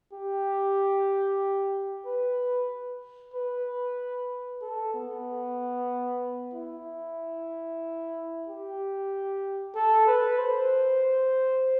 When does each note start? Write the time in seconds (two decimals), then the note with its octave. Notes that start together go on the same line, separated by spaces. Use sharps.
0.13 G4
2.06 B4
3.34 B4
4.62 A4
4.94 B3
6.54 E4
8.47 G4
9.75 A4
10.07 B4
10.39 C5